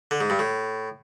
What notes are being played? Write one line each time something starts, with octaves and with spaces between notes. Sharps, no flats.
D3
G#2
G2
A2